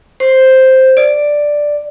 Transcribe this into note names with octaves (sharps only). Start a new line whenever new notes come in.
C5
D5